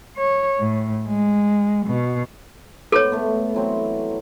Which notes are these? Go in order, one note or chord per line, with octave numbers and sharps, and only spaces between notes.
C#5
A2
G#3
B2
G#2 B3 A4 C#5
A3 B3
E3 F#3 C4